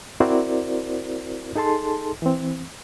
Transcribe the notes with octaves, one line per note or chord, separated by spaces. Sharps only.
C4 E4 F#4 A#4 C5 D5
D#4 G#4 A4 A5 C6
E3 C4